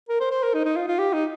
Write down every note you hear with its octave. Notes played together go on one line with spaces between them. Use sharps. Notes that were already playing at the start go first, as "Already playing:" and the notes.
A#4
C5
C5
A#4
D#4
D#4
F4
F4
G4
D#4